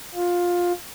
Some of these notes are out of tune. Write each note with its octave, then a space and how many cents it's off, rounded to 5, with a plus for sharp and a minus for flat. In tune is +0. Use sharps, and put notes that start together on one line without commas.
F4 +15